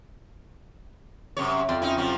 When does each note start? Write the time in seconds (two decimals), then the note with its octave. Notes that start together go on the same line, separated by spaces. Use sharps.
1.37 F#2 C3 C#5
1.69 F2 D5 C6
1.82 C#4 D#4 E4
1.97 C3 F3 F#3